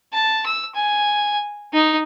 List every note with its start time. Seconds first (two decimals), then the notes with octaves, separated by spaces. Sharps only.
0.13 A5
0.46 E6
0.75 G#5
1.73 D#4